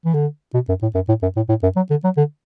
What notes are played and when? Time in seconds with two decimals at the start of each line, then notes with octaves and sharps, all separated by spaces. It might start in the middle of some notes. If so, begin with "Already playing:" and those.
0.05 E3
0.14 D3
0.54 B2
0.69 F#2
0.82 A2
0.95 F#2
1.08 A2
1.22 F#2
1.36 A2
1.49 A2
1.63 F#2
1.76 F#3
1.90 D3
2.04 F#3
2.17 D3